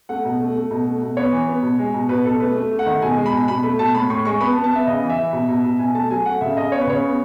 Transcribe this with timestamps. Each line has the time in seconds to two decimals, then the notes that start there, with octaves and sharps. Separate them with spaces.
0.09 A3 F#5
0.25 B2
0.40 A3
0.55 A3
0.71 B2
0.87 A3
1.02 B2
1.17 B3 C#5
1.32 E3
1.48 B3
1.63 B2
1.79 G#3
1.94 B2
2.09 B2 B4
2.25 B2 A4
2.40 A3 B4
2.56 A3
2.71 A3
2.79 F#5
2.86 D#3
3.02 B2 G#5
3.17 G#3
3.26 B5
3.33 B2
3.48 B2 B5
3.63 A3 B5
3.79 B2 A5
3.95 A2 B5
4.10 A2 C#6
4.25 G#3 C#6
4.41 B3 B5
4.52 A5
4.56 B3
4.64 A5
4.72 B3 E5
4.87 C#3 D#5
5.03 E3
5.09 E5
5.18 E3
5.33 B2
5.49 B2
5.64 B2
5.79 B2 G#5
5.94 A3 A5
6.11 F#3 G#5
6.26 A3 F#5
6.41 C#3 E5
6.57 C#3 D#5
6.72 B3 C#5
6.81 B4
6.87 C#3 C#5
7.03 B3